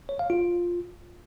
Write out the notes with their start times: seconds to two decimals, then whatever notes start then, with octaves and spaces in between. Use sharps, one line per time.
0.09 C#5
0.19 F5
0.30 F4